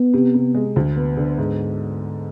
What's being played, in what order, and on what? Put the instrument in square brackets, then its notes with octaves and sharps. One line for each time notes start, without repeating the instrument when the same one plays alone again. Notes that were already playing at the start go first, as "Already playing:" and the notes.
Already playing: [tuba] B3
[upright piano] C3
C3
G#3
D2
B3
D3
G#2